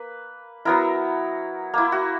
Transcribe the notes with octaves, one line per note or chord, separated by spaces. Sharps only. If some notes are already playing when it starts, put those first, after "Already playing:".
Already playing: A#3 B4
F#3 B3 E4 A#4
A#3 E4
F#4